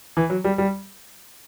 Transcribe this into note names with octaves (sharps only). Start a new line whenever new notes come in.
E3
F#3
G3
G3